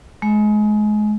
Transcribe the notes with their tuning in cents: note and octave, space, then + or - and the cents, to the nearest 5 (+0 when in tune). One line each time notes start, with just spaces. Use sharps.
G#3 +30